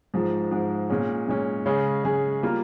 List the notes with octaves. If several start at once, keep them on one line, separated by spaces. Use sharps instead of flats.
G#2 F3 G#3
G#2 F3 G#3
A#2 G#3 C#4
A#2 G#3 C#4
C#3 G#3 C#4 G#4
C#3 G#3 C#4 G#4
G3 A#3 F4